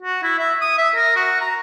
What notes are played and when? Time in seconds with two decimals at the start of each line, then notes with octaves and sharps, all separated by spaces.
0.02 F#4
0.23 E4
0.39 E5
0.61 D#6
0.78 E5
0.95 A#4
1.16 F#4
1.41 A#5